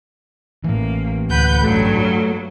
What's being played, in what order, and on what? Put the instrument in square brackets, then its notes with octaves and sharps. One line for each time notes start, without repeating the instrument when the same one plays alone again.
[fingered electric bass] A2 E3 [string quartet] A#3
[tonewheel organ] D2 F#5 [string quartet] B4 G6
[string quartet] G2 F#3 [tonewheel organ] A3